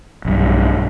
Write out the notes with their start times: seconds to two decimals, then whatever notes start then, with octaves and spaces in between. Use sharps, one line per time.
0.25 B1 G2